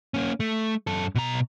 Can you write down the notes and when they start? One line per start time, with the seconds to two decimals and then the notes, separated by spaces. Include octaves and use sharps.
0.14 A#3 C#4
0.40 A3
0.87 F#2 A4
1.15 B2 A#5